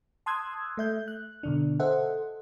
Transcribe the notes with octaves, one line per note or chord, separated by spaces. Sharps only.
A5 C6 D#6 E6 F#6 G#6
A3 E5 G6
F#6
B2 D3 D4
A4 C5 D#5 E5 F#5